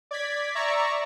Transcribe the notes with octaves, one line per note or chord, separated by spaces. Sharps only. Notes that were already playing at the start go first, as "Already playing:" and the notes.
D5 G#6 B6
D5 E5 A#5 C#6